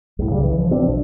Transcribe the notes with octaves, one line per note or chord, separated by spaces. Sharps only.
C2 A2
C#3 G3
E3
F3
B2 C4 D4
B1